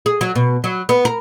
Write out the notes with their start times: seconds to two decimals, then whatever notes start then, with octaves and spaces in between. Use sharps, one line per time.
0.06 G#4
0.21 F#3
0.35 B2
0.64 F#3
0.89 B3
1.05 A#4